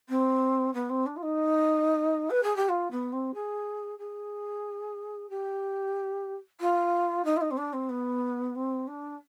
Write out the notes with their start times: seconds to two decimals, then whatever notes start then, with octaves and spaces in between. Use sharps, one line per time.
0.09 C4
0.74 B3
0.89 C4
1.06 D4
1.16 F4
1.23 D#4
2.30 B4
2.43 G#4
2.56 G4
2.69 F4
2.91 B3
3.12 C4
3.34 G#4
3.99 G#4
5.29 G4
6.60 F4
7.24 D#4
7.37 F4
7.41 D#4
7.51 C4
7.57 D4
7.73 C4
7.89 B3
8.55 C4
8.88 D4